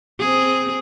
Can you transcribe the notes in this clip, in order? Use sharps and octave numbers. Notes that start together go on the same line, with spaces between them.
C4 G#4